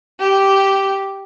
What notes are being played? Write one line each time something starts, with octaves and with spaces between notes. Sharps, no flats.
G4